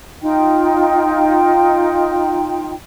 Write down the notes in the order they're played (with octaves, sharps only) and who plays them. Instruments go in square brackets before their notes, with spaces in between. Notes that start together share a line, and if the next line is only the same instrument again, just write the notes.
[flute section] D#4 F4 G5